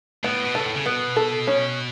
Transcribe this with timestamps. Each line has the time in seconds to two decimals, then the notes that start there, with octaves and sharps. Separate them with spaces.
0.24 A2 B3
0.45 B2
0.55 A4
0.65 A2
0.76 C#3
0.85 B2 B3
1.16 A4
1.47 C#4